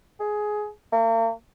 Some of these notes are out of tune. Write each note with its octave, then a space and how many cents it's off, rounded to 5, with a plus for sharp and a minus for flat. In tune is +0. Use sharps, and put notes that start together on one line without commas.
G#4 +15
A#3 -45